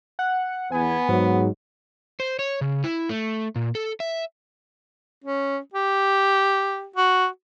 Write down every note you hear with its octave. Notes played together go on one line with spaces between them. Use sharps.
F#5
E2 B3 G#5
G#2 F#3
C5
C#5
C#3
E4
A3
A#2
A4
E5
C#4
G4
F#4